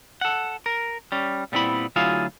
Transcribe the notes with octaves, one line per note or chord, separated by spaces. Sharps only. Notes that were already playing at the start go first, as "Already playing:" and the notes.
A4 F#5
A#4
G3 C#4
A#2 G3 B3 C4 E4 B5
D2 F#3 E4 F4 G#4 F5